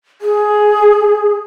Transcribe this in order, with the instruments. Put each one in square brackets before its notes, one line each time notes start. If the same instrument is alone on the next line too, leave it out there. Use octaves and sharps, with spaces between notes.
[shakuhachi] G#4